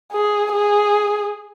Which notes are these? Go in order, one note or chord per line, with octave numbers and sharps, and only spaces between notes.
G#4
G#4